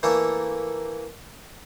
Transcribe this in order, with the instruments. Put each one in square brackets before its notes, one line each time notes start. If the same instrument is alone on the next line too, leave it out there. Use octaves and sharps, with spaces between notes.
[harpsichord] E3 A3 A#3 D4 A4